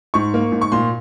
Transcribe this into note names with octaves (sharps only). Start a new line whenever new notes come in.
G#2 C#6
A#3
G#2
C#6
A#2 C6